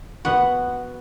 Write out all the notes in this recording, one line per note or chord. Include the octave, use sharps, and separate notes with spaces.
B3 F#4 F#5